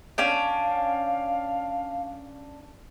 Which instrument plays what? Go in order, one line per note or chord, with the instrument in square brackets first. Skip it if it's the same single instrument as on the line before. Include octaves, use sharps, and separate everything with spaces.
[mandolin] C#4 D4 G5 [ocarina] F5